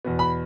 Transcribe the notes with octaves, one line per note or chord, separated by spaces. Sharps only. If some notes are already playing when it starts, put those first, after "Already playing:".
E2 B2 B3
B5